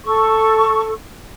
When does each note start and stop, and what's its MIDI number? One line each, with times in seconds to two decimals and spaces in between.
0.04 0.93 69
0.04 0.93 85